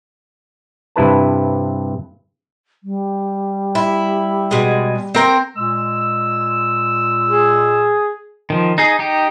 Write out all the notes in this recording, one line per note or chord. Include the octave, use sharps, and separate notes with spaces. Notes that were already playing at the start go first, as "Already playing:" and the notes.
G2 C3 E4 B4 A5
G3
E4
B2 G#3
C4 A#4 G5
A#2 G#3 E6
G#4
D#3 F3
D#4 G#4
D#4 G4